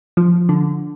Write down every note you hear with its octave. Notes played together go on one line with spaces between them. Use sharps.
F3
D3